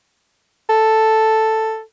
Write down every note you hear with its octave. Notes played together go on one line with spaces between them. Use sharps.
A4